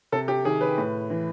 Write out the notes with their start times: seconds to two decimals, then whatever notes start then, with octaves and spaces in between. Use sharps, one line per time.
0.12 C3 A4
0.28 G4
0.45 D#3 G#4
0.61 B4
0.78 A2
1.10 E3